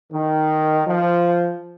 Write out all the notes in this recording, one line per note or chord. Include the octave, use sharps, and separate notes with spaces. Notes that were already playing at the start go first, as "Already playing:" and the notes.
D#3
F3